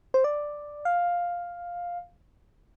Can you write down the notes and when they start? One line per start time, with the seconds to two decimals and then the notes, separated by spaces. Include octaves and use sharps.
0.14 C5
0.24 D5
0.85 F5